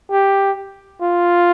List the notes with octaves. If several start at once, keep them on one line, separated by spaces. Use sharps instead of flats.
G4
F4